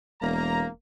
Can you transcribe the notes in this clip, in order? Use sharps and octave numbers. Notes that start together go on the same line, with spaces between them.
E1 A#3 A#5